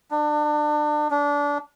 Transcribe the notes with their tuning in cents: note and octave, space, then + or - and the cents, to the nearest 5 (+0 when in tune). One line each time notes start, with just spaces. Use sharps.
D4 +30
D4 -25